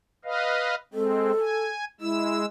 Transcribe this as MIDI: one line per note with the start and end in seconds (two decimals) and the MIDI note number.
0.25 0.75 71
0.25 0.75 75
0.25 0.75 77
0.94 1.32 56
0.94 1.32 60
0.94 1.66 69
1.40 1.85 80
2.01 2.46 56
2.01 2.40 64
2.01 2.46 88